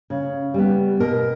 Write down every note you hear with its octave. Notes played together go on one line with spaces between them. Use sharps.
C#3
G3 B3
B2 A#4